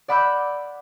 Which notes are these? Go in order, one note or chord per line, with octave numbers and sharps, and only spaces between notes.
D5 F#5 B5 D6 E6 G6